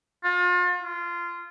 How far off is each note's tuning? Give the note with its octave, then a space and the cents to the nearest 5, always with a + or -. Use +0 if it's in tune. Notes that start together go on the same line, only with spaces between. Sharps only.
F4 +35
F4 -15